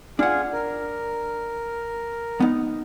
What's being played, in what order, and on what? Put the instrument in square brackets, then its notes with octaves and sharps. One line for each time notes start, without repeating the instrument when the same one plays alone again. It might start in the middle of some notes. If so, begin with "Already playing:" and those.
[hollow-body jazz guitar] D4 F#5 [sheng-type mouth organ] F4 G#4
[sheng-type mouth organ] A#4
[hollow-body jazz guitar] B3 D#4